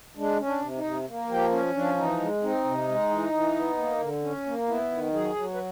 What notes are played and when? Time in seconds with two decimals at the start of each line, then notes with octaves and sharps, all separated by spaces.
0.17 G#3 D4
0.39 C#4
0.46 D4
0.61 C3
0.76 D#4
0.84 C3
1.07 A#3
1.29 F3 G4
1.51 C#4
1.74 F3 D4
1.97 E3 D#4
2.20 G#3
2.43 C4 D#4
2.64 C3
2.87 G#3
3.10 E3
3.33 E3
3.55 B3
3.77 A#3
4.00 D3
4.22 C#4
4.46 A#3
4.68 B3 E4
4.91 D#3
5.13 F#3 G#4
5.35 F#3
5.54 B4